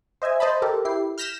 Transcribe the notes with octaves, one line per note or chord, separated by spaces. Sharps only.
C5 D#5 E5 G#5
C5 D#5 A5 B5
G4 A4 A#4
E4 G4 C7
F6 G6 A#6 B6 E7